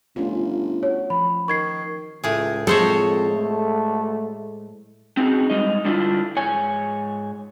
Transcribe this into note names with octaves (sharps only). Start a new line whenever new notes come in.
G1 A3 C#4 F4
F#4 C#5
F3 B5
D#3 C#6 G#6 C7
C#2 A2 G#4
F2 G#3 A4 C5 C#5
A3
C4 C#4 D#4 F#4 G#4
G3 G#3 D#4 D#5
D3 G3 D4 E4 F4
G#2 C#5 G#5